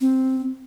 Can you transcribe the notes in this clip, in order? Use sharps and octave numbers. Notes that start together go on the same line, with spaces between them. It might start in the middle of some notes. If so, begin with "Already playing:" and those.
C4